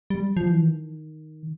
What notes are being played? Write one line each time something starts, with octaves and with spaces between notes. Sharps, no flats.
G3
F3
E3
D#3